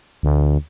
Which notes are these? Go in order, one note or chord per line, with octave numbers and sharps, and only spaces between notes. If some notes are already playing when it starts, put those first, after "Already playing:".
D2